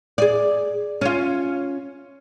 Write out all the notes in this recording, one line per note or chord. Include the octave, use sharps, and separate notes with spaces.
G#4 D5
C#4 F4